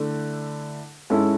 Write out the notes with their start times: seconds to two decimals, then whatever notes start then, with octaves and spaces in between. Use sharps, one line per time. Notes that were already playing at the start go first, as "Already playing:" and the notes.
Already playing: D3 A3 E4
1.10 G#2 G#3 C#4 E4 A4